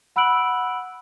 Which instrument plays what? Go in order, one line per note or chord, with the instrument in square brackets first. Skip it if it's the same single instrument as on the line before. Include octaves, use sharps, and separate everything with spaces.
[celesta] F#5 B5 E6 F#6 D7 F#7